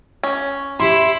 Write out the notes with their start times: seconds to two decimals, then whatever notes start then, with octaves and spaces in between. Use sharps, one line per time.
0.23 C#4
0.80 E4 G4 E5 C6